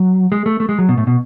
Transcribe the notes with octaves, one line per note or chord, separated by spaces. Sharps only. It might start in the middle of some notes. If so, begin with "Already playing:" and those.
Already playing: F#3
G#3
A3
A3
G#3
F#3
B2
A2
B2